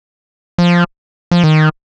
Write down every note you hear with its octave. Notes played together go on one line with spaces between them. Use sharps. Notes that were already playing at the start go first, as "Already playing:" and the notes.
F3
F3
D#3